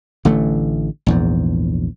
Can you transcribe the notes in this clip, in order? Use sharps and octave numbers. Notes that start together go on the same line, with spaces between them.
A1 D3 A3
A#1 E2 G#2